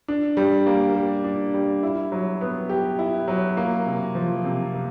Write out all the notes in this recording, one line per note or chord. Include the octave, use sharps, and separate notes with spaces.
D4
G3
A#3
G3
D4
G3
E4
F#3
B3
G4
E4
F#3
A#3
C3
F3
C3
A#3